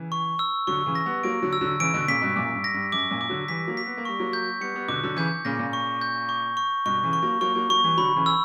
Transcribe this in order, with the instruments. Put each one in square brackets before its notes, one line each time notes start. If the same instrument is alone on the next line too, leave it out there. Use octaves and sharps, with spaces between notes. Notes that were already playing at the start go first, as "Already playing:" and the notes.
Already playing: [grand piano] C#3 E3
[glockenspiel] C#6
E6
[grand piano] D3 F#3 [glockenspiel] C#6
[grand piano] C#3 E3
[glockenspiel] A#6
[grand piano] G3 B3
[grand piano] F#3 A#3 [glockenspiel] D7
[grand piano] D3 F#3
[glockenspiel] E6
[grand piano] D3 F#3
[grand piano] C#3 E3 [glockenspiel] D7
[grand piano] B2 D3
[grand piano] A#2 C#3 [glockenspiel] B6
[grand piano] G2 B2
[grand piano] F#2 A#2 [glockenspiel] D6
[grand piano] G2
[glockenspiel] A#6
[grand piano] G2
[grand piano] F#2 [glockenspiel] D6
[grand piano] F#2 A#2
[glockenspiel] D6
[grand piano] D3 F#3
[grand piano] E3 G3 [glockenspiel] B6
[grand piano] F#3 A#3
[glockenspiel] B6
[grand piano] B3
A#3
[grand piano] G3 [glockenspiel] C#6
[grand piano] F#3 A#3
[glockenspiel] G6
[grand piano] G3 B3 [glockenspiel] C#7
[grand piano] G3 B3
[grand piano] B2 D3 [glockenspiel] D6
[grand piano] D3 F#3
[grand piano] C#3 E3 [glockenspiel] G6
[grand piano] A#2 C#3 [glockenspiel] A#6
[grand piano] A#2 C#3
[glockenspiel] C#6
G6
C#6
C#6
[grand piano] G2 B2 [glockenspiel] C#6
[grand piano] C#3 E3
[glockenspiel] C#6
[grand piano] F#3 A#3
[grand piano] F#3 A#3 [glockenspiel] C#6
[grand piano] F#3 A#3
[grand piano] F#3 A#3 [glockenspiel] C#6
[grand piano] E3 G3
[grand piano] D3 F#3 [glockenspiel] B5
[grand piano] C#3 E3
[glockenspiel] E6